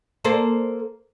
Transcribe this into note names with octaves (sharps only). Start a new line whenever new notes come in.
A#3 A4 C5